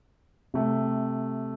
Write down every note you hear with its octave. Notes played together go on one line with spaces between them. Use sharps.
C3 A3